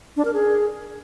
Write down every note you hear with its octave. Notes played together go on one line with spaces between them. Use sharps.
D4
A#4
G#4